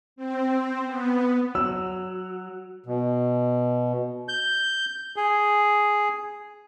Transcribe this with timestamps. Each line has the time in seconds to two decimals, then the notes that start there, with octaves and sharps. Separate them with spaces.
0.16 C4
0.86 B3
1.55 F#3 E6
2.84 B2
4.28 G6
5.16 G#4